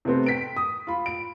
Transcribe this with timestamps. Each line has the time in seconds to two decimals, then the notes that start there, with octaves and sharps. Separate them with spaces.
0.05 C3 A3 B3 C4
0.26 G5 B6 D7
0.57 D#6
0.87 F4 B5
1.06 D7